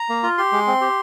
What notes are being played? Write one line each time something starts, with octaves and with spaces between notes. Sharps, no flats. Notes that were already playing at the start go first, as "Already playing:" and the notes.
Already playing: A#5
A#3
F4
G4 C6
G#3
C4
G4